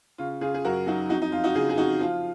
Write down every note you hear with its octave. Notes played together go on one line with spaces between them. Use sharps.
C#3 F4
C#3 F4 G#4
G#4
F#2 F#4 A#4
F#3 D#4 F#4
F2 D#4 F#4
D#4
F2 F4
D#4 F#4
C#3 F4 G#4
G#4
F2 D#4 F#4
F3 F4